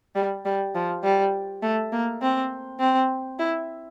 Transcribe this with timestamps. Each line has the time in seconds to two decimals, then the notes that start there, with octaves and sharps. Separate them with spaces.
0.15 G3
0.45 G3
0.75 F3
1.04 G3
1.62 A3
1.92 A#3
2.22 C4
2.80 C4
3.39 E4